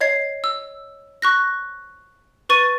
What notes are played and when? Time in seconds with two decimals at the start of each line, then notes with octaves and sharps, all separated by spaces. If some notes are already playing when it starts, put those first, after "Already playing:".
0.01 C#5 D#5 G#6 C7
0.44 E6
1.22 C#6 F#6 A#6
2.49 B4 C#6 A6 D#7